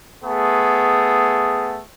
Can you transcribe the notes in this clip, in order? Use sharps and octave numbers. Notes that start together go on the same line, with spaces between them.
A3 B3 G#4